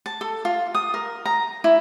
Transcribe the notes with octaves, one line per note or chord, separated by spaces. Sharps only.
A5
A4
F4
D#6
A#4
A#5
E4